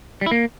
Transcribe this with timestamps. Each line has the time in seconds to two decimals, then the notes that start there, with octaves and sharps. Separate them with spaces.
0.21 G3
0.26 E4
0.31 A#3